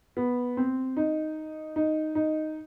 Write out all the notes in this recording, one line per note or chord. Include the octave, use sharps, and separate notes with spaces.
B3
C4
D#4
D#4
D#4